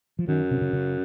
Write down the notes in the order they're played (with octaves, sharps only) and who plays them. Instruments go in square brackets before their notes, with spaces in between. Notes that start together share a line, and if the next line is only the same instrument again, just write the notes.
[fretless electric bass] F3
[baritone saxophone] F#2 [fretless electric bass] D#3
[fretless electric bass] C3
C#3
C#3